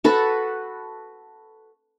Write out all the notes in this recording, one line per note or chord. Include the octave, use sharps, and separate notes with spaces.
F#4 A4 B4